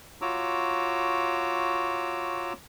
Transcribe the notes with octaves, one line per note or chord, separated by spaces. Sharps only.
F4 F#4 C#5 A#5 D6 E6